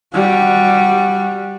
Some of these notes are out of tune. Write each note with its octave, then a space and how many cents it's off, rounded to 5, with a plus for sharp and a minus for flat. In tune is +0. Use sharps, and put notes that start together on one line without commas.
G3 +0 F#4 -15